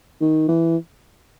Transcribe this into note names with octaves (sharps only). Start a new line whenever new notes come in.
D#3
E3